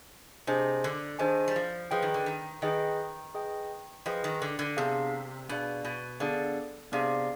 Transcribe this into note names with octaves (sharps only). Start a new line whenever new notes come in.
C3 D4 G#4 C5 D#5 G#5
D3
D#3 D4 G#4 C5 D#5 G#5
G3
F3
F3 G#4 B4 D#5 G5
D#3
D3
D#3
D#3 G#4 B4 D#5 G5
G#4 B4 D#5 G5
F3 G#4 B4 D#5 G5
D#3
D3
D3
C3 B3 D4 G#4 D5 F5
B2 B3 D4 G#4 D5 F5
B2
D3 B3 D4 G#4 D5 F5
C3 B3 D4 G#4 D5 F5